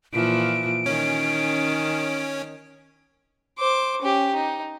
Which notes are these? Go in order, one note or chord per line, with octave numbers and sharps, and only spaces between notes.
A#2 E3 F3 D7
D#3 C#4
C5 D6
C#4 G4
D#4